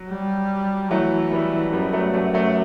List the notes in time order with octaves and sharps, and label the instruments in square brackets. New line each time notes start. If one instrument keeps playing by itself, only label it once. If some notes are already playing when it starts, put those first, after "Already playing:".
Already playing: [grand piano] F#3
[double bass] G3
[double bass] E3 [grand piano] F#3 A3
[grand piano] G3 B3
[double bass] F#2 [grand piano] G3 B3
[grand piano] F#3 A3
F#3 A3
F#3 A3